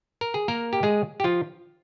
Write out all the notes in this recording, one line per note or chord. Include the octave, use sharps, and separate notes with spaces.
A#4
G#4
A#3 A#4
G4
G#3 G#4
G4
F3 F4